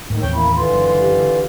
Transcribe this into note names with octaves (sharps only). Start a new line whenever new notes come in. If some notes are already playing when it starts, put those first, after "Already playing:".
G#2 D#3 A3
A1 D#2 C4 C#5 G5
A#3 E4 B5
D3 E3 F4 C6
F#1
G4